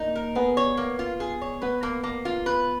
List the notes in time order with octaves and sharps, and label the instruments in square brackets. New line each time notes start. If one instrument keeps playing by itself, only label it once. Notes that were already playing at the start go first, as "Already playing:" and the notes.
Already playing: [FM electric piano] A#3 [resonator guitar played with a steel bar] D#4
[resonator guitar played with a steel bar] A#4
[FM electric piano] B3 [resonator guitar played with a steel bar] G#4
[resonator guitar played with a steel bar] C#5
A#3
F4
G#4
C#5
[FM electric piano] B3 [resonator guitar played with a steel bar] B4
[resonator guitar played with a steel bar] A#3
A#3
F4
B4